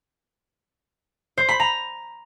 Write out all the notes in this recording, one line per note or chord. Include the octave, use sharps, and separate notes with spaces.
C5
B5
A#5